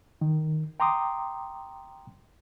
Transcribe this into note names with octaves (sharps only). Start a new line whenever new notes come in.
D#3
G5 A#5 C6 D6 D#6